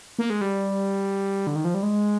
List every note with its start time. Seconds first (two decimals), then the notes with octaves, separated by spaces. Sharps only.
0.19 A#3
0.30 G#3
0.41 G3
1.47 D3
1.55 D#3
1.65 F3
1.74 G3
1.83 G#3